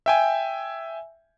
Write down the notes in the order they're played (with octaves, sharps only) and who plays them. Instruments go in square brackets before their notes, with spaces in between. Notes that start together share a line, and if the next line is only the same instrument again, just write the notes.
[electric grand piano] E5 G5 G#5